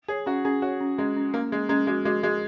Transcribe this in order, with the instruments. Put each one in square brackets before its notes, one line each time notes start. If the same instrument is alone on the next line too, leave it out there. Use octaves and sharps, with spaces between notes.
[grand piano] G#4 [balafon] C#5
[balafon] C#4 [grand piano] F#4
[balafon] C#4 [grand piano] G#4
[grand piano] F#4 [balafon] C#5
[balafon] C#4
[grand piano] G#3 [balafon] C#4
[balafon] C#4
[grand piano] A#3 [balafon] C#4
[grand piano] G#3 [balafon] C#4
[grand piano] G#3 [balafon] C#4
[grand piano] G#3 [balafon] F#4
[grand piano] G#3 [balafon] F#4
[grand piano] G#3 [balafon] F#4